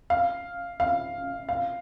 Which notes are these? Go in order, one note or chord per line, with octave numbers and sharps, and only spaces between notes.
F5
F5
F5